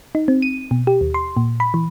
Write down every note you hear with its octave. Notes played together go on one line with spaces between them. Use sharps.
D#4
C4
D#7
B2
G4
D#2
C6
A#2
B5
E3